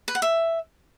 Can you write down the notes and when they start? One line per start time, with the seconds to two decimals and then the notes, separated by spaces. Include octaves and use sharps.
0.08 B4
0.15 F#5
0.22 E5